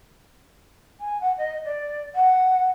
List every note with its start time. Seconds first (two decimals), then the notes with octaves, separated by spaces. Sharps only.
1.00 G#5
1.21 F#5
1.38 D#5
1.65 D5
2.15 F#5